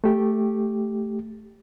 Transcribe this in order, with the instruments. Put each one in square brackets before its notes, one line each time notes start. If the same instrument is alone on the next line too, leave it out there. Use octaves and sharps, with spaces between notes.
[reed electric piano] A3 G4